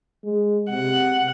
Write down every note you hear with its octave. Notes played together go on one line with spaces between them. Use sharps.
G#3
C3 F#5